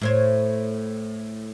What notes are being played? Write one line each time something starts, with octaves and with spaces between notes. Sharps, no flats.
A2 C5 C#5